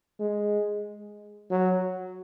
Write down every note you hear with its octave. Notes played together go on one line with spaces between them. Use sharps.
G#3
F#3